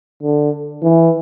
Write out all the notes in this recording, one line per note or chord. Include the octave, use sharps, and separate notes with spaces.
D3
E3